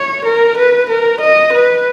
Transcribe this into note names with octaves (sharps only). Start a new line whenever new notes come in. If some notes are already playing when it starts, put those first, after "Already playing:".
Already playing: C#5
A#4
B4
A#4
D#5
B4